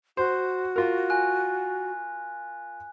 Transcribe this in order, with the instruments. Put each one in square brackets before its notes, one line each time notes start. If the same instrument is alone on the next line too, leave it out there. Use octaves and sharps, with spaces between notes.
[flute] F#4 [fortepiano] C5
[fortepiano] F4 A#4
[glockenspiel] G#5 F#6